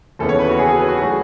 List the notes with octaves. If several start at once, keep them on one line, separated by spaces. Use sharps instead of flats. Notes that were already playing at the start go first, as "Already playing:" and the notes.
D#2 C#3 E3 B3 A4
C#5
B4
F#4
G#4
G#4
B4
F#4
F#3 A3 G#4